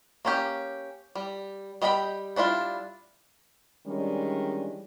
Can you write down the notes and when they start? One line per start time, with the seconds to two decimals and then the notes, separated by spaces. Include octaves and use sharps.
0.25 A#3 C#4 G4
1.15 G3
1.82 G3 D#5 G5 A#5 B5
2.36 G3 D4 E4 F4
3.86 D#3 E3 G3 G#3 C#4 D4